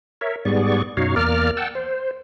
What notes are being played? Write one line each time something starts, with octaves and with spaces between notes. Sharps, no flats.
A#4 C#5 E5
G#2 G3 B3 G#4 D5 C#6
F#2 B2 D#4 F#4 C#5 F5
E2 A#3 A#4 D5 F6
F#5 G5 A5 E6
C5